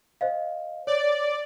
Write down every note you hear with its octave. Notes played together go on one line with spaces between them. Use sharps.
C5 D#5 F5
C#5 D5